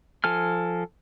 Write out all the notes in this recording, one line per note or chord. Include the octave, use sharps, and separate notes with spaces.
F3 A4 G#5 F6